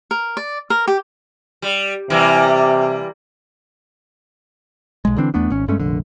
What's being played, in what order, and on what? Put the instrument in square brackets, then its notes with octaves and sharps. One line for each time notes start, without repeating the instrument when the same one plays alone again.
[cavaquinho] A#4
D5
A#4
G4
[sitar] G3
[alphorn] C3 [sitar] E3 G3 A#3
[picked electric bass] B1 G#3
D3 E3 C4 D4
E2 A3 B3 D4
G#1 C#4
G2 G#3 A3 C#4
F1 A#1 D3